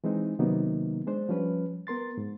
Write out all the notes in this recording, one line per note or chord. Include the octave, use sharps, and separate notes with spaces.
E3 G#3 C4 D#4
C3 D#3 F#3 A#3 B3 D#4
G#3 D4 C5
F3 G3 C#4 B4
B3 A#4 C6 A6
G#2